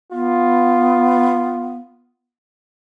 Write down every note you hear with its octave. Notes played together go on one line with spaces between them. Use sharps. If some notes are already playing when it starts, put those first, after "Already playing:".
B3 F4